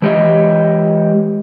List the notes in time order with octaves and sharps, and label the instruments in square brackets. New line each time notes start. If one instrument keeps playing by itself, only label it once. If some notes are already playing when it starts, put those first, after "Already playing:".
[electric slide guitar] E3 G#3 G4 C#5 D#5 E5